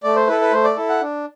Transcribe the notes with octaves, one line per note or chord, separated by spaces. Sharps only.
A3 D5
C5
E4 A4 B4
B4
A3 C5
D5
E4 A4
F#5
D4